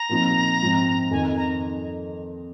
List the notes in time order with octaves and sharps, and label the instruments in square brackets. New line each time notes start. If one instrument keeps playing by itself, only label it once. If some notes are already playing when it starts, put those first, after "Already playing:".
Already playing: [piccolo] A#5
[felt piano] A#2 F3 C4 D#4
G#2 F3 C4
[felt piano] F2 D#3 C4 D#4 [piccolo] G#5
[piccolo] A#5